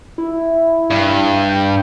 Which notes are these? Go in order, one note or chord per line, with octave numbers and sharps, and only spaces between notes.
E4
G2
G5